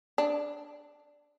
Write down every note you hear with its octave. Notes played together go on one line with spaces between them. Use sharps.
D4